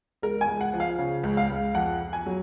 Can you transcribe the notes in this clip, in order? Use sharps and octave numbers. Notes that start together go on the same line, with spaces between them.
C#2 A#4
G#5
C#2
F#5
F3
F5
C#3
C#2
F5
C#2
F2 F#5
F2
G#5
F#3